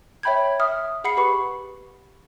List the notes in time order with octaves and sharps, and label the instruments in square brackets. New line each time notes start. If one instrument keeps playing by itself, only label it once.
[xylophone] C#5 E5 G5 B5 G6 G#6
E5 D#6 F6
G#4 F#5 B5 C7 C#7
G4 B4 B5 C#6